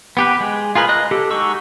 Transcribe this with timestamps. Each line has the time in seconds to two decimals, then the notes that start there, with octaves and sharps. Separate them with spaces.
0.17 B3 G4 B4
0.40 G#3
0.75 F4 G#4 A#4 B4
0.89 D#5 F#6
1.11 G4 A4
1.31 G#3 D#4 F#4 C#6 E6